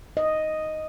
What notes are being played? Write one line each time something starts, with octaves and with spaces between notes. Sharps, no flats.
D#5